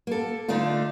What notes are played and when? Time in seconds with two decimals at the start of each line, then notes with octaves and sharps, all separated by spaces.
0.07 A#3 A4
0.48 D3 A3 D4 D#4 F4